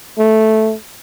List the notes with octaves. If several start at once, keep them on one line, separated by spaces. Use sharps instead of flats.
A3